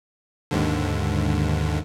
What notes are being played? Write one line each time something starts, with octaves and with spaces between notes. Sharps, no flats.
D#2 G#2 D3